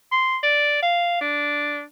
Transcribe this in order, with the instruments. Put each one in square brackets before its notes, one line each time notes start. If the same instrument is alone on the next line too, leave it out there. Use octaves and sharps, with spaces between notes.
[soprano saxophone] C6
D5
F5
D4